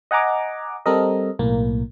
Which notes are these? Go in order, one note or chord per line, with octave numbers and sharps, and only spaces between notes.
D#5 F#5 G#5 A#5 D6
G3 C4 A4 A#4 D#5
B1 A2 A#3